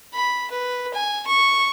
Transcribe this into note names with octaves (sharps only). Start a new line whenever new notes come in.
B5
B4
G#5
C#6